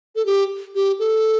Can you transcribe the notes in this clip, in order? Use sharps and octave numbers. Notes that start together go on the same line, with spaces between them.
A4
G4
G4
A4